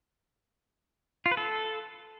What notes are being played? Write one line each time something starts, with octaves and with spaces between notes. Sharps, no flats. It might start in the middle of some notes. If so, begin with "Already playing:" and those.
F4
B4
A4